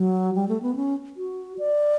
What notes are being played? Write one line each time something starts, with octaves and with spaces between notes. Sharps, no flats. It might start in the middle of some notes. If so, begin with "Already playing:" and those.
Already playing: F#3
G3
A3
B3
C#4
F#4
D5